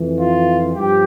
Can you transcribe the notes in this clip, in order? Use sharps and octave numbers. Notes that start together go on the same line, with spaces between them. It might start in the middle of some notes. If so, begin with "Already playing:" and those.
Already playing: F2 E3
F4
G2 F3 G4